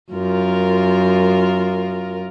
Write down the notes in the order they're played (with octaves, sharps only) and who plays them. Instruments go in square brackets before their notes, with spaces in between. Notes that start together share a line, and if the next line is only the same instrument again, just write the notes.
[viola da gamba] F#2 F4 A#4